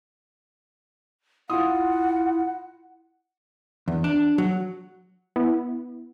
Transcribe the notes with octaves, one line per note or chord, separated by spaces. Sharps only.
E4 F4 F#5 C6 D#6
E2
D4
F#3
B3 E4